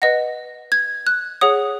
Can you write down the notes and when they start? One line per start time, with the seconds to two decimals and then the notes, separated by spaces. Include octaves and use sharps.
0.02 B4 D#5 F#5 A#6
0.72 G#6
1.07 F#6
1.41 G#4 C#5 F#5 D#6